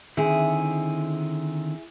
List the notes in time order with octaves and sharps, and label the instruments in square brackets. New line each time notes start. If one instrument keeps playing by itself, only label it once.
[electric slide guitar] D3 D#3 C4 [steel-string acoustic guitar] E4 G#4